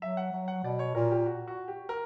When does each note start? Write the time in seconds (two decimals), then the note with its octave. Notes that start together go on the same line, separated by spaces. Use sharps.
0.01 F#3 E5
0.17 F#5
0.32 F#3
0.48 F#5
0.64 B2 D5
0.79 C#5
0.95 A#2 A#4
1.11 G4
1.26 F#4
1.48 F#4
1.68 G4
1.89 A#4